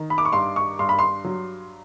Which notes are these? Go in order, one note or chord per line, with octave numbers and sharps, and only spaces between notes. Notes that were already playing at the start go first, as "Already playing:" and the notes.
Already playing: D#3
B5
D6
C#6
G2 C6
C#6
G2 C6
B5
C6
F#3